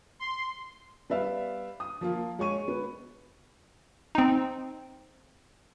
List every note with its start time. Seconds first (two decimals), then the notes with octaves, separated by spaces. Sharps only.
0.20 C6
1.09 G3 B3 B4 D5 E5 F5
1.80 D#6
2.01 F3 A#3 F4
2.39 G#3 C#5 C#6 D#7
2.68 B3
4.15 C4 D#4